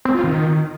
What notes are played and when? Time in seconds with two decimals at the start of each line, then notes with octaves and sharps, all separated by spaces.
0.05 C4
0.15 F4
0.24 D#3